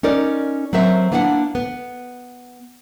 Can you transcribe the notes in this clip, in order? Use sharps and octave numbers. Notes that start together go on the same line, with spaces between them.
C#4 D#4 A#4 D5
F#3 A3 C4 A#4 E5
A#3 B3 D4 E4 F5 F#5
B3